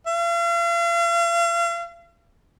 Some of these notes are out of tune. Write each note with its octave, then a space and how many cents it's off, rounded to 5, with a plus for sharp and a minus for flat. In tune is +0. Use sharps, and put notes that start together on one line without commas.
F5 -40